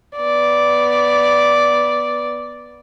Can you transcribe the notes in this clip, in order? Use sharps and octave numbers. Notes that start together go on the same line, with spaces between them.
B3 D5